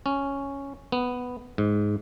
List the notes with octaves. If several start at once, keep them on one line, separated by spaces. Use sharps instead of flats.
C#4
B3
G#2